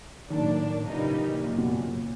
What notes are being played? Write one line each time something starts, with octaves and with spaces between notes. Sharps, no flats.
A2 D#3 F#3 A#3 D4
A#2 C#3 E3 G3 A#3 D#4
G#1 F#2 A#2 C#3
B2
A#2